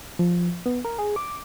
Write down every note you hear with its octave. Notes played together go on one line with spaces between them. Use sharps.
F3
B3
A#4
G#4
D6